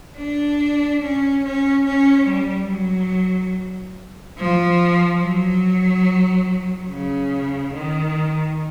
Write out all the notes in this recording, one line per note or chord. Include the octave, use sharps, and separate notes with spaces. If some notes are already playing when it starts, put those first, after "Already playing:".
D4
C#4
C#4
C#4
G3
F#3
F3
F#3
C#3
D#3